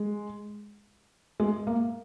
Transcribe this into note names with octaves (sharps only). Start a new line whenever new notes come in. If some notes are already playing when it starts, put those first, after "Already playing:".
Already playing: G#3
G#3
A#3